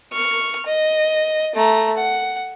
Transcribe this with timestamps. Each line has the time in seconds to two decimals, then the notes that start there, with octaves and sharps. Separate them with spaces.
0.13 C#6 F6
0.66 D#5
1.55 A3 A#5
1.97 F#5